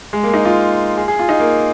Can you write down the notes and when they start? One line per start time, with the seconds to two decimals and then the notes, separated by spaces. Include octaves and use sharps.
0.13 G#3
0.23 A#3
0.34 D#4
0.45 F4
0.97 G#4
1.08 G#4
1.19 F4
1.29 D#4
1.40 A#3